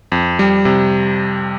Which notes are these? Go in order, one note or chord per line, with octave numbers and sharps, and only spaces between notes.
F2
G3
C3